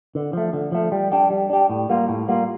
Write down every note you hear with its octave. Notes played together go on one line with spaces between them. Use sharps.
D3
F3 A3
D3
F3 A3
G3
D4 G4
G3
D4 G4
A2
G3 A#3 F4
A2
G3 A#3 F4